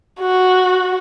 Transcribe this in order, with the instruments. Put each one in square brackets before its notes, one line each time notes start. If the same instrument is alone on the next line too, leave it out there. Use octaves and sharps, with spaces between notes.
[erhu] F#4